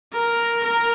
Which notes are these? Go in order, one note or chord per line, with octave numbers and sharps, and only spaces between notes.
A#4
A#4